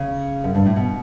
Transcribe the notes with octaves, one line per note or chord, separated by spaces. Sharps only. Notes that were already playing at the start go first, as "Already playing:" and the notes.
Already playing: C#3
F#2
G2
A2
B2